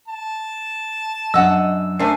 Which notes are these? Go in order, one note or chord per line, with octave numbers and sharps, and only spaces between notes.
A5
F#2 D4 D#5 F#5 E6
A3 D4 A#4 C5 G#5 C7